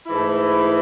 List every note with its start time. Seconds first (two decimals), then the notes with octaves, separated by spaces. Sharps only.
0.06 G#2 E3 A3 E4